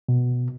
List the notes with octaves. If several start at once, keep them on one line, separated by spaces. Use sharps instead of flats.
B2